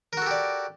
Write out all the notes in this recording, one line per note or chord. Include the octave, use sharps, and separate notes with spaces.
F#4 G4 A4 A#4 D5